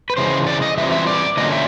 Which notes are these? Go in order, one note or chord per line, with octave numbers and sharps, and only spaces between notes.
B4
C#3 E3 G#3 C5
D5
D#5
E3 G3 C4 F4 E5
E5
D5
D3 F#3 A#3 C#4 F4 D#5
E5